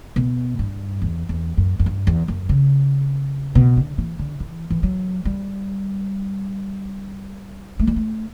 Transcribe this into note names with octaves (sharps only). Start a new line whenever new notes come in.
B2
G2
E2
E2
F#2
F#2
G2
E2
F#2
C#3
B2
D3
E3
D3
E3
E3
F#3
G3
A3
G3
A3